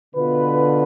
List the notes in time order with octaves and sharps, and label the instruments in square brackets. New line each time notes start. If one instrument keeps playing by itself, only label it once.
[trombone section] B2 B3 F4 B4 [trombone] D3